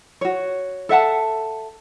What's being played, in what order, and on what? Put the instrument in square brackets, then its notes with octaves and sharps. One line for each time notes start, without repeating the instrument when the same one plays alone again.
[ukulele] F#4 C#5
A4 E5 F#5 A5